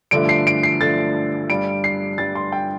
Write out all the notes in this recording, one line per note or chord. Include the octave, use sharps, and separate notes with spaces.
G2 D3 F3 A3 D7
C7
D7
C7
G2 D3 F3 A3 A6
G2 G3 D7
C7
G2 G3 A6
C6
G5